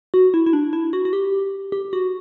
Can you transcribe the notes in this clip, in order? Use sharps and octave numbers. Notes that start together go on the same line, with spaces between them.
F#4
E4
E4
D4
E4
F#4
F#4
G4
G4
F#4